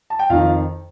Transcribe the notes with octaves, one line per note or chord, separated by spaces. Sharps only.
A5
G5
F2 D#3 F4 F5